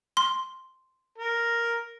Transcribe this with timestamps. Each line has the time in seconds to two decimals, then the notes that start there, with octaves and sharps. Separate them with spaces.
0.17 C6
1.18 A#4